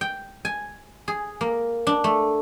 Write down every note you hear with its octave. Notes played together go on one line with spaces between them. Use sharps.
G5
G#5
G#4
A#3
D4
A3